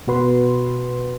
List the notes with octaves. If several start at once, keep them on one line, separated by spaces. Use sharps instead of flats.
B2 F#4 B4 C6